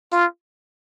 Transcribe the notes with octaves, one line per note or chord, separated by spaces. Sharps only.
F4